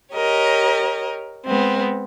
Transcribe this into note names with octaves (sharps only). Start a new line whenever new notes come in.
G4 A#4 C#5 D#5
G#3 B3 C4